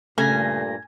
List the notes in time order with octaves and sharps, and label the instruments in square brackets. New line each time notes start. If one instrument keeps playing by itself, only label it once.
[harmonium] G2 A#2 [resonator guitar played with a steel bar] C#3 [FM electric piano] A3 A#6 [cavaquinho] G#5